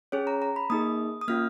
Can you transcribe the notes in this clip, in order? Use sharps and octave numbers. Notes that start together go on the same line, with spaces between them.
C#4 G#4 C#5
A#5
A#5
B5
A#3 D#4 G#4 D#6
D#6
A#3 C#4 F4 F6